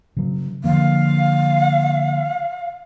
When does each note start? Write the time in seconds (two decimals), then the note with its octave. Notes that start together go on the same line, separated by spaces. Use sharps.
0.17 C#3 F#3
0.64 D3 F3 A#3 F5